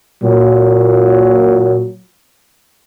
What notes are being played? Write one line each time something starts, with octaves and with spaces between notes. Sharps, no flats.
A#2 F#3